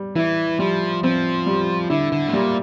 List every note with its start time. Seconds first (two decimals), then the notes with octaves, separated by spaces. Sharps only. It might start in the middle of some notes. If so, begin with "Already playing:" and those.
Already playing: G3
0.16 E3 E4
0.59 F3 G3
1.03 F3 C4
1.46 G3
1.90 D3 E4
2.12 D3
2.28 A2
2.33 A#2 G3